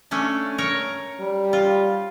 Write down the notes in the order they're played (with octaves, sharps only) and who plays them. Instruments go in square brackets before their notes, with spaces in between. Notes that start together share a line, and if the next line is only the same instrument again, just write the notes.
[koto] A3 C#4 D4
A#4 C#5 A#5
[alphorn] G3
[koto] F4